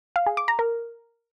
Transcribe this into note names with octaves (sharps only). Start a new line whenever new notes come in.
F5
G#4
D6
A#5
A#4